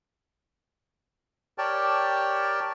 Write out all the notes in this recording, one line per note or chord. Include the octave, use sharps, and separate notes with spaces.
G4 A#4 C#5 D5 G5 A5